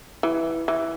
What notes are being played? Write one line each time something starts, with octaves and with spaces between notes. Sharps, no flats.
E3
E3